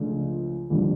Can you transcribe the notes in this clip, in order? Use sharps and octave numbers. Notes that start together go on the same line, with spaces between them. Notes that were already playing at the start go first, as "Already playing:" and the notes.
Already playing: C#2 C#3 F3 A3 D4
F#1 F2 D3 G3